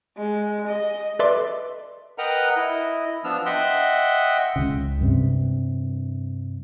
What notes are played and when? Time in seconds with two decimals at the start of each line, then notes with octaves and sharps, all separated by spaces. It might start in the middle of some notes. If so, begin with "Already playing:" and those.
0.18 G#3
0.67 D#5
1.19 A4 B4 D5 E5 C6 D6
2.18 A#4 B4 D#5 F#5 G5 A#5
2.57 E4 D#5
3.24 F3 B3 D4 E6 F6
3.46 D#5 E5 F#5 G5 C6
4.56 C#2 C#3
5.01 G2 C3